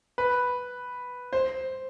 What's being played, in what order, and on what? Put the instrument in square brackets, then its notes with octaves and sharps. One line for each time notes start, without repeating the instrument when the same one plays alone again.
[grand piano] B4
C5